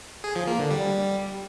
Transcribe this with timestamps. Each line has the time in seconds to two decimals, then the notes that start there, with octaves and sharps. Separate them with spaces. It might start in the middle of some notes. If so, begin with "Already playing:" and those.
0.24 G#4
0.36 F3
0.47 A#3
0.59 D3
0.71 G3